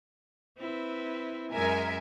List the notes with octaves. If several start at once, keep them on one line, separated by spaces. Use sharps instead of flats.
C4 E4 B4
F#2 G#3 A#4 E5 G#5